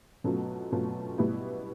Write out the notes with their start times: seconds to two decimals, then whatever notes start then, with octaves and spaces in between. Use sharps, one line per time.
0.24 B2 F#3 A3 C#4 F4
0.72 B2 F#3 A3 C#4 F4
1.18 B2 G3 B3 E4